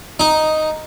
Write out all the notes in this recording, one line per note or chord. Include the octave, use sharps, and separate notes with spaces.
D#4